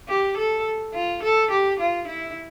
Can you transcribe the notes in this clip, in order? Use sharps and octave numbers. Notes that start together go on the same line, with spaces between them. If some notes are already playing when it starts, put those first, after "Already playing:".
G4
A4
F4
A4
G4
F4
E4